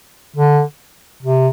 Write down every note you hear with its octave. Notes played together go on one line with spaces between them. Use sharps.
D3
C3